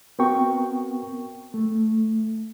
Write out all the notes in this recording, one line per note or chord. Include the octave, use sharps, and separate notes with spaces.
B3 C4 F#4 A#4 G5 C#6
A3